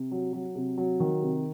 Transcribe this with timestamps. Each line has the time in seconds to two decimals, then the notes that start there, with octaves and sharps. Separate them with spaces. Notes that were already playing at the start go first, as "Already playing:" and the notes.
Already playing: C3
0.11 F#3
0.33 F#3
0.55 C3
0.78 F#3
1.00 D#3
1.22 C3